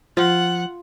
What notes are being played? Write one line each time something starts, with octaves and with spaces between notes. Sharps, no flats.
F3 F4 F#5